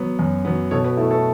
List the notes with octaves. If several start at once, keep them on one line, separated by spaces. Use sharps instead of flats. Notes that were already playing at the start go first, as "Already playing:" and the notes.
Already playing: F#3 B3
F#2
F#3 B3
B2 A4 C#5
F#4 B4
A3 E4 A4
E4 A4